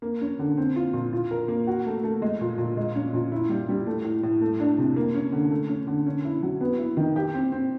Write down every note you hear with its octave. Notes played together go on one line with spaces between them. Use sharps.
A#3
C#4
D3
C4
F4
A#2
F4
A#4
A#3
F#4
A3
A3
G#3
A#2
A#2
G#3
C#4
A#2
E4
G3
G3
A3
A2
A2
A3
D4
C3
A#3
C#4
D3
A3
C#4
D3
C#4
E4
F#3
B3
E4
D#3
G4
C4
C4